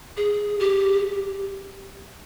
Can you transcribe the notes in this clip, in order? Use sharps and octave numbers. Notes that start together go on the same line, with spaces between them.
G#4
G4